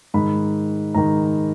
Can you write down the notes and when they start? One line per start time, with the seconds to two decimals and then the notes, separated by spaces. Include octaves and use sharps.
0.14 G#2 D#3 B5
0.94 G#2 D#3 A#5